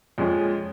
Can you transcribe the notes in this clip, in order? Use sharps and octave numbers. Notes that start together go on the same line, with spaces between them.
F2 F3 G#3 C#4 G#4